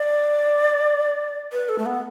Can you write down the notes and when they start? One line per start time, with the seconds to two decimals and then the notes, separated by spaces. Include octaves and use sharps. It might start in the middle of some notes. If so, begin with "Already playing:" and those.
Already playing: D5
1.52 B4
1.69 A4
1.79 A3
1.86 B3